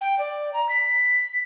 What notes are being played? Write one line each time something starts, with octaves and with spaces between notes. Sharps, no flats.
G5
D5
A#5
B6